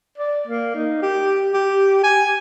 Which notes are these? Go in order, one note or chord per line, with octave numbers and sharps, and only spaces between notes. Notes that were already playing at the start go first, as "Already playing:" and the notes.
D5
A#3
D#4
G4
G4
G#5